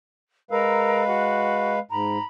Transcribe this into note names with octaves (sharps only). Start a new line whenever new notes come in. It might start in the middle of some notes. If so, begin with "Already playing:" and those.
G#3 A#4 B4 F5 A#5 E6
F#4
G#2 A#5 B5